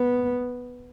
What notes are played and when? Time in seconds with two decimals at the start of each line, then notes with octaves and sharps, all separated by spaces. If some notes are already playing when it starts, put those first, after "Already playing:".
Already playing: B3